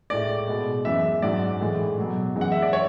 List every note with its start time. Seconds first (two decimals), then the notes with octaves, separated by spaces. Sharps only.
0.10 A2 G#3 D5
0.48 B2 G#3
0.85 F#2 E3 G#3 E5
1.22 G#2 F#3 D5
1.60 A2 E3 G#3
1.98 B2 F#3
2.35 F#2 E3 G#3
2.41 F#5
2.52 E5
2.62 D5
2.73 C#5